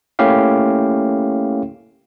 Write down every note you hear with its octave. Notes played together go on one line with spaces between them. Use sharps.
A3 A#3 C#4 E4 G4 F5